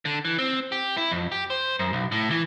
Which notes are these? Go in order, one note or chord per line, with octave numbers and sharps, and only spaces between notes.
D3
E3
C4
G4
E4
F2
G4
C5
F#2
B1
A2
E3